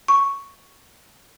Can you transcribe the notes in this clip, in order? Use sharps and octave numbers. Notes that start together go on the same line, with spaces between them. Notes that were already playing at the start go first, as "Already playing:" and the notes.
C#6